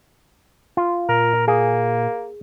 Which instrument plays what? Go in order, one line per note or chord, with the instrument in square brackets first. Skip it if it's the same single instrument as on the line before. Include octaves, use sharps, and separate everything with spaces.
[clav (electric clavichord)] F4
[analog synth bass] A#2 [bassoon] A#4
[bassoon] A#3 [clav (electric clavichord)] G#4